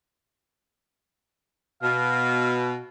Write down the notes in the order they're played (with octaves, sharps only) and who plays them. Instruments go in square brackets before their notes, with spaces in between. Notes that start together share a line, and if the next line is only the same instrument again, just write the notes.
[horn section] B2 [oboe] F5